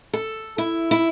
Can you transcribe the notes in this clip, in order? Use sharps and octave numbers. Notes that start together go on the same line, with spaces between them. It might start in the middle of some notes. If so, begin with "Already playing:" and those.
A4
E4
E4